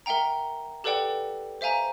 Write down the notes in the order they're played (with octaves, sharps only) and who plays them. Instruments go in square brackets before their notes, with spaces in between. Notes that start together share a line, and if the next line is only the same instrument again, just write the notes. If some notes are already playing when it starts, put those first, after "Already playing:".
[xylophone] A#4 E5 F#5 G5 A#5
G4 A4 B4 D5 F#5 G5
C5 E5 F5 G#5 A#5